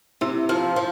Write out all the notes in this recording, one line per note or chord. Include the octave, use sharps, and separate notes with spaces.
C3 E4
F3 F4
F3